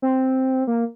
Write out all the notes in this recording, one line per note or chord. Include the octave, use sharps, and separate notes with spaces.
C4
A#3